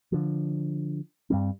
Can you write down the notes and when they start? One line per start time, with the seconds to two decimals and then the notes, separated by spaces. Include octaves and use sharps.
0.12 D3 F3
1.30 G2 G3 C4